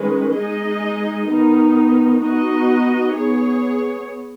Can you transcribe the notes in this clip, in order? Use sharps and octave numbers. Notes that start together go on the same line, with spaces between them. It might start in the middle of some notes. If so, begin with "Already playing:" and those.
Already playing: D#3 G#3 C#4 B4
G#3 D#4 G#4 D#5
D#3 B3 D#4
B3 D#4 F#4 D#5
B3 G#4 C#5